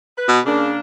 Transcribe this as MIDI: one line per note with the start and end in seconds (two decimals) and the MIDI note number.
0.17 0.39 71
0.28 0.40 47
0.45 0.73 49
0.45 0.79 58
0.45 0.79 62